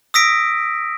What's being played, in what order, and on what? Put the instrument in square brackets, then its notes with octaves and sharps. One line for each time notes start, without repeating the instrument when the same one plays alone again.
[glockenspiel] D#6 E6 A#6 B6 D7